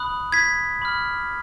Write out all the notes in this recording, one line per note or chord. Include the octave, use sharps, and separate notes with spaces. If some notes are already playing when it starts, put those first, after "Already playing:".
Already playing: B5 D#6 F#6
G#6 B6
B5 D6 F6